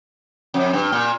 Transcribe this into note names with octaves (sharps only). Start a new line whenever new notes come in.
F2
G2
A#2